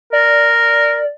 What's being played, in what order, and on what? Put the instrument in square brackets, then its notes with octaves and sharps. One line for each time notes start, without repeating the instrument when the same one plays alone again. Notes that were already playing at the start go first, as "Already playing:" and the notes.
[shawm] A#4 [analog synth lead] D5